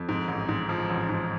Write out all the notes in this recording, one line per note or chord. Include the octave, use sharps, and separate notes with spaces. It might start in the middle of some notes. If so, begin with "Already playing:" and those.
Already playing: F2
G#2
A1
G#2
F3
A1
G#2